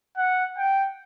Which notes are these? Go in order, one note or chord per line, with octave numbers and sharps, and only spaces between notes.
F#5
G5